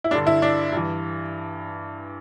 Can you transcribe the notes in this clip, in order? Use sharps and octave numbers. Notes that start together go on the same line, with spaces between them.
E4
G2 D3 D4
E4
D4
G2 E3